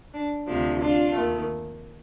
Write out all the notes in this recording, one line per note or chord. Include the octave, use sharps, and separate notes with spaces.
D4
D2 C3 F3 D4
D4 F4
D#2 D#3 A3